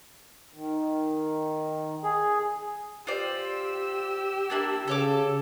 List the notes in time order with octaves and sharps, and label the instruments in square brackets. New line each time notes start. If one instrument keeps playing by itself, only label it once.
[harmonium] D#3
[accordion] G#4
[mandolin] F4 C5 D5 [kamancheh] G4 E6
[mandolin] A#3 D4 E4
[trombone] C#3 [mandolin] A4 C#5 D6